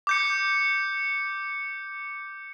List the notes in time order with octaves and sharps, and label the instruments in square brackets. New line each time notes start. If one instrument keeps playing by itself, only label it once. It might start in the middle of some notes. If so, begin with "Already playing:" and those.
[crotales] D6 G6 C#7